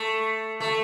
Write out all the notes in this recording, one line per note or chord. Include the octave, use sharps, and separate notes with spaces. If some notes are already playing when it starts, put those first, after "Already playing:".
Already playing: A3
A3